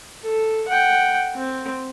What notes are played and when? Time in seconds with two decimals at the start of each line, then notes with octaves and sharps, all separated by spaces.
0.24 A4
0.68 F#5 G5
1.35 C4